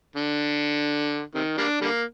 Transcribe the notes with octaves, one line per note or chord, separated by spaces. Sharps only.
D3
C3 D#3
G3 A#3 D4
D3 G3 A#3